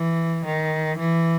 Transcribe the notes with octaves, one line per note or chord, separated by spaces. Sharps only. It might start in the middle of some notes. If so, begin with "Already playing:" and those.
Already playing: E3
D#3
E3